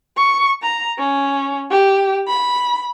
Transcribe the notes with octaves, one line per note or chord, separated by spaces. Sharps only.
C#6
A#5
C#4
G4
B5